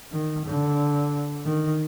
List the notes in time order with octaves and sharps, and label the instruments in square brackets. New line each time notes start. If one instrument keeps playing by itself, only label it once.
[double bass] D#3
D3
D#3